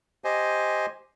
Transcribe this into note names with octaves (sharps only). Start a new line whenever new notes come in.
G4 C5 D#5 G#5